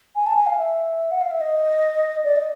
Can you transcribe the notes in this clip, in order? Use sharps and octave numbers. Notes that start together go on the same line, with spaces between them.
G#5
A5
G#5
F5
E5
F#5
F5
E5
D#5
D5
D#5